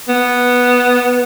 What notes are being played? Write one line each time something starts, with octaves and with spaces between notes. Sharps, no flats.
B3